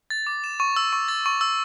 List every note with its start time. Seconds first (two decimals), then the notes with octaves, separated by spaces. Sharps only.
0.10 A6
0.27 D6
0.44 E7
0.60 C#6
0.76 E6
0.93 C#6
1.08 A6
1.26 C#6
1.41 E6